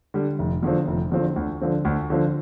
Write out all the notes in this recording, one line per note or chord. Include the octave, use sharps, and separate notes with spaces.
D3 G3
F1
E2 D3 F3 C4
F1
E2 D3 F3 C4
D2
D3 F3 C4
D2
D3 F3 C4